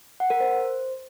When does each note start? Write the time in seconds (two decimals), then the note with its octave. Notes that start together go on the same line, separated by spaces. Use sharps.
0.20 F#5
0.30 A#4
0.40 C5